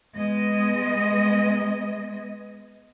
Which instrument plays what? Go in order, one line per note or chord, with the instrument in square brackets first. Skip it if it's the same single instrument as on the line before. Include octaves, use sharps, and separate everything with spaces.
[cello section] G#3 B3 D#5